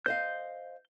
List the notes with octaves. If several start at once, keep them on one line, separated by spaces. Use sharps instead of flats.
C5 D#5 F5 G6